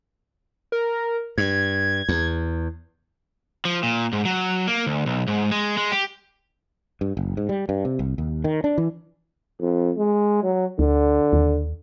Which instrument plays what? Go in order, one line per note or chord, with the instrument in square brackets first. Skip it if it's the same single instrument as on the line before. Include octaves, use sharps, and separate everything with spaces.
[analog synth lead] A#4
[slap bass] G2 [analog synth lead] G#6
[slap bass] E2
[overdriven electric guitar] F3
A#2
G#2
F#3
A#3
D2
B1
G#2
G#3
G#3
G4
[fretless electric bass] G2
F#1
G#2
G3
G2
C3
C2
D#2
D#3
D4
E3
[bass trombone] F2
G#3
F#3
[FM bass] D2 [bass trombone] D3
[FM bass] D#2